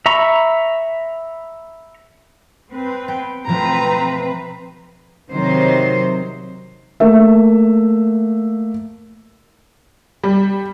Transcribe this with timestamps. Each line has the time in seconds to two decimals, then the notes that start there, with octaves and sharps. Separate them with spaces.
0.06 E5 A#5 B5 C#6
2.72 C4 B4
3.08 B3 G5
3.47 B2 F3 A3 C4 B4 A#5
5.32 C3 D#3 F#3 C5
7.00 A3 A#3 E5
10.24 G3